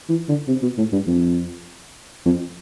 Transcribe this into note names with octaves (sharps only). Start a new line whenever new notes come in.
E3
D3
C3
B2
A2
G2
F2
F2